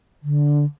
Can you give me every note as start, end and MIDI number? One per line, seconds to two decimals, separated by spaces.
0.23 0.64 50